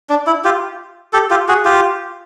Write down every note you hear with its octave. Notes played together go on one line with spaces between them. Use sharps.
D4
E4
F4 G4
G4 A4
F4 G4
F#4 G#4
F4 G4